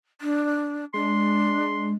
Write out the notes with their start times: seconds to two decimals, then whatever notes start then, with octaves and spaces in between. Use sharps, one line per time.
0.21 D4
0.94 G#3 D4 C6